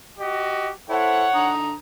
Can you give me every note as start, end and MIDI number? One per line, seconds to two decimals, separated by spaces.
0.19 0.69 66
0.19 0.69 67
0.19 0.69 75
0.90 1.26 64
0.90 1.26 69
0.90 1.26 72
0.90 1.51 73
0.90 1.51 78
1.35 1.73 50
1.35 1.73 82
1.35 1.73 87